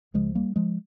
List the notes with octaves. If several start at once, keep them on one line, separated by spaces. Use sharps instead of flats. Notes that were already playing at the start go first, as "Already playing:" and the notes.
C#2 C#3 F3 G#3
G3 A#3
F3 G#3